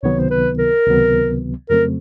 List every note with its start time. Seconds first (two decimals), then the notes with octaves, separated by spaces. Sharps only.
0.03 C#2 C3 D#3 F#3 B3 C#5
0.20 C5
0.30 B4
0.58 A#4
0.86 C#2 C3 D#3 F#3 B3
1.70 F2 C#3 F#3 A3 C4 A#4